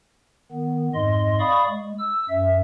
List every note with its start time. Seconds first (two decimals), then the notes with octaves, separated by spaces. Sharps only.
0.51 D#3 B3
0.95 F2 G#2 D#5 C6
1.40 D5 F5 B5 C#6 D#6
1.69 G#3
1.99 E6
2.29 F#2 E5